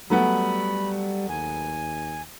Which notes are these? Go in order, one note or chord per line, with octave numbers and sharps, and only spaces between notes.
F#3 G3 A3 B3 B5
D#2 G#5